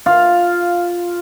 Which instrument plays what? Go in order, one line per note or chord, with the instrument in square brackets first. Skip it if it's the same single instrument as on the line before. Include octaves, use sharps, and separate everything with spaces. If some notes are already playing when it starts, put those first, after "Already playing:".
[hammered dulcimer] F4 F5